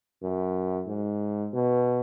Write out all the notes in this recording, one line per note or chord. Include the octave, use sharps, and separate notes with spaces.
F#2
G#2
B2